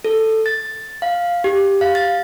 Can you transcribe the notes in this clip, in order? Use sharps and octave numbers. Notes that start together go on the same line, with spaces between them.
A4
A6
F5
G4
F5
A6